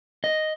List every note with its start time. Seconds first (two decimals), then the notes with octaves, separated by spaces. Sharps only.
0.24 D#5